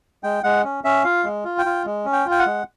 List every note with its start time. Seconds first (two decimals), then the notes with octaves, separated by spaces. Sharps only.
0.24 G#3 G5
0.44 G#3 F#5
0.64 C#4
0.84 C#4 E5
1.04 F4 F5
1.24 G#3
1.44 F4
1.58 G5
1.66 F4
1.86 G#3
2.05 C#4
2.13 G5
2.26 F4
2.31 G5
2.39 F#5
2.47 G#3